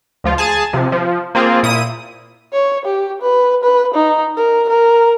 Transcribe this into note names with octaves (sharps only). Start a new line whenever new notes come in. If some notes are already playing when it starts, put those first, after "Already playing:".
D2 F3 F4
G#4 G#5 A5
C3 F3
F3
A#3 C4 F4 G#4
A#2 E4 D#6 D#7
C#5
G4
B4
B4
D#4
A#4
A#4